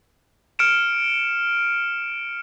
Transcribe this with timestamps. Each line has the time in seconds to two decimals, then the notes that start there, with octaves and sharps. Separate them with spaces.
0.59 F6 C#7 D7 E7